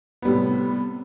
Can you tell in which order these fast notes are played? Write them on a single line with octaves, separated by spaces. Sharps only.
B3 G3 A2 C3